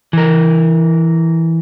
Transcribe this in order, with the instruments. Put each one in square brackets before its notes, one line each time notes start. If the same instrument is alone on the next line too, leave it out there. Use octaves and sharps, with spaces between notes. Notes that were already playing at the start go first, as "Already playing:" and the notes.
[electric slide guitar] E3 A#4